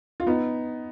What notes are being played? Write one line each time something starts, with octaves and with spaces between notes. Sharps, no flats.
F4
B3 D#4